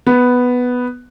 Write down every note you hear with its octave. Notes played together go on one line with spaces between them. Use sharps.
B3